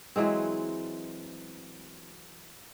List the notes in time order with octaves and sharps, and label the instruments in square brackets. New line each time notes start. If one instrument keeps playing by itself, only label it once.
[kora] E3 F#3 G#3 C4